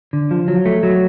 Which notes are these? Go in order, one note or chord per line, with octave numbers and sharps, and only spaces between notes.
D3
F3
F#3
A3
F#3